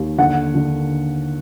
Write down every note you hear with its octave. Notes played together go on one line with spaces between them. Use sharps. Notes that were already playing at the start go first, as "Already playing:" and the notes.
Already playing: D#2
D3 F#5
D3